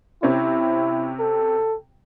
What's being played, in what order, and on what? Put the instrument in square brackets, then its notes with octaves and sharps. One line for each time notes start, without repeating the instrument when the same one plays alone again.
[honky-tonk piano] C3 C4 C#4 [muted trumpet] E4
[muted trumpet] A4